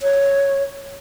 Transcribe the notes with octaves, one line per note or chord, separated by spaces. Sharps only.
C#5